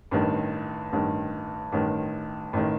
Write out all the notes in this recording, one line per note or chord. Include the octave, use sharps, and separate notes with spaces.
A1 G2 D#3
A1 G2 D#3
A1 G2 D#3
A1 D#3